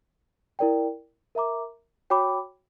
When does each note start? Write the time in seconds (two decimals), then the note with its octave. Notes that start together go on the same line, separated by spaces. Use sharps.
0.59 E4 A#4 D5 G5
1.35 A#4 E5 A#5 D6
2.10 F#4 C#5 G5 B5 D6